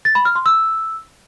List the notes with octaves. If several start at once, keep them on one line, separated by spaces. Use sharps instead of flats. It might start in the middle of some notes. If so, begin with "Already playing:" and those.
A6
B5
F6
C6
E6